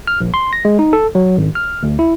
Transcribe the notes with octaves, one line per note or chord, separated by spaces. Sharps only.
F6
A#1
C6
A#6
G#3
D#4
A4
F#3
G#1
F6
D2
E4